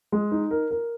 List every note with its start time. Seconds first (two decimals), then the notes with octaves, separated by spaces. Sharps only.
0.12 G#3
0.32 D#4
0.51 A#4
0.71 A#4